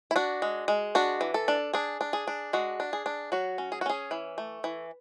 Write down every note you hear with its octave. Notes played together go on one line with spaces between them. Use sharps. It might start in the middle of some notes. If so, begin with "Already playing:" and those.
E4
D4 F#4
G#3
G#3
D4 F#4
E3
A4
D4
D4 G#4
D4
G#4
D4
G#3 F#4
D4
G#4
D4
F#3 F#4
C#4
G#4
F#4
C#4 G#4
E3
A3
E3